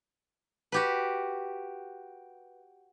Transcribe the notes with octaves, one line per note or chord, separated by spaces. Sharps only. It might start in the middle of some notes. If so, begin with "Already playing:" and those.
F#4 G4 B4